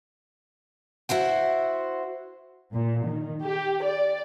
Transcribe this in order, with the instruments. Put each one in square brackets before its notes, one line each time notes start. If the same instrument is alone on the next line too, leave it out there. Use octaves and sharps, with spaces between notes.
[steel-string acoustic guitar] E4 F#4 C5 F#5
[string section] A#2
D#3
G4
D5